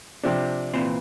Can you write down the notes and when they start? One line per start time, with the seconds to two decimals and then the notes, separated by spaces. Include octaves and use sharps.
0.23 C3 F3 D4
0.74 A#2 E3 C4